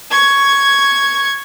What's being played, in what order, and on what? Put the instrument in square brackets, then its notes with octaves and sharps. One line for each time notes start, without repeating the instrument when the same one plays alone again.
[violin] C#6 G#6